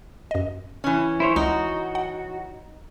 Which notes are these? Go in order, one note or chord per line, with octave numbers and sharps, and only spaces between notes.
F#2 D#5
E3 C#4
E4 C5 C#5
C#2 D#4 F#4
F#5